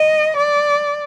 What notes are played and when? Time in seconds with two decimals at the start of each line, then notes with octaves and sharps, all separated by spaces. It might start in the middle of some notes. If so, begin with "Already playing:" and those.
Already playing: D#5
0.37 D5